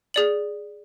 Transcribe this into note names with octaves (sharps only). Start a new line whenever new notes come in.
G#4 D5 F#7